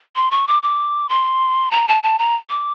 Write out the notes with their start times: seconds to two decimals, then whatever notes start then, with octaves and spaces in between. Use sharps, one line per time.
0.16 C6
0.31 C#6
0.48 D6
0.63 D6
1.09 C6
1.71 A#5
1.88 A5
2.03 A5
2.19 A#5
2.50 D6